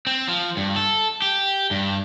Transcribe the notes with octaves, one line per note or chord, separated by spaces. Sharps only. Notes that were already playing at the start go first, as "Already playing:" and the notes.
C4
F3
G2
A4
G4
G2